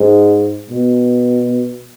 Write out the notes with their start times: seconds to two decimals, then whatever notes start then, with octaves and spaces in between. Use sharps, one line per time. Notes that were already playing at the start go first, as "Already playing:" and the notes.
Already playing: G#2
0.70 B2